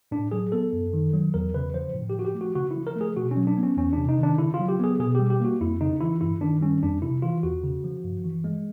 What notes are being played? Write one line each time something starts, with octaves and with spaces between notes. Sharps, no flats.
A2 D4
F#3 G#4
B3 A4
F#2
D#3
F#3
E2 A#4
C#3 B4
F3 C5
A2
G4
F3 F#4
G4
A3
F#4
C#3 F#4
E4
F3
A#4
A3
G#4
B2 F#4
C#4
F#3
D4
B3
C#4
E2 C#4
C3 D4
D#4
D#3 D4
C#3 E4
F4
F#3
G4
B3 G#4
B2 G#4
G3 G4
G4
A#3 F#4
F2 E4
C#3 D#4
E3 E4
G2 E4
D#3 D4
G3 C#4
F2 D4
C3 E4
E3 F4
E2 F#4
C#3
F3
G2
E3
G#3